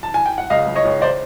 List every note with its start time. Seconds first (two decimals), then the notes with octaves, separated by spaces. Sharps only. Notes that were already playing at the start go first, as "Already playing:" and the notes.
0.03 A5
0.14 G#5
0.26 G5
0.38 F#5
0.50 C#2 D#5 F5
0.67 C#2
0.76 C#5 D#5
0.85 C#2
1.02 C5 D5